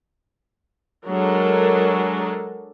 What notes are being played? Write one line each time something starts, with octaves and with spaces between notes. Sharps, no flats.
F#3 G#3 D4 A4 A#4